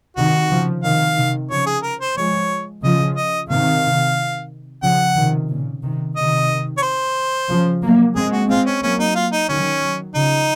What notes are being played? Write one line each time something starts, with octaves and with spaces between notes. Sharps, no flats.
C3 D#3 F#4
C#3 F3
C3 D#3 F5
C3 D#3
C#3 F3 C#5
G#4
A#4
C5
F3 G#3 C#5
C#3 F3 D#5
D#5
C3 D#3 F5
C#3 F3 F#5
C3 D#3
A#2 C#3
C3 D#3
C3 D#3 D#5
C#5
C5
C#3 F3
F#3 A#3
G#3 C4 G#4
F#4
G#3 C4 F4
C#4
F#3 A#3 C#4
D#4
F4
D#4
D#3 F#3 C#4
D#3 F#3
C#3 F3 D#4